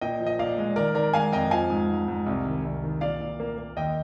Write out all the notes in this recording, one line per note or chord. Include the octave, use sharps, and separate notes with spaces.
A#2 D#5 G5
F3
D#5
A#2 D5 F5
G#3
D#3 A#4 D5
D#3 A#4 D5
G#3 F5 G#5
F2 D#5 G5
F3 F5 G#5
G#2
G#2
G#2
C2
D#3
C2
D#3
A#2 D5 F5
A#2
A#3
A#3
D#2 D#5 G5